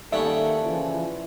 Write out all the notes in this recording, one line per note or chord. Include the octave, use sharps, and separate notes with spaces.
D#3 G3 A#3 B3 C#4 A4 E5
C#3 E3 F3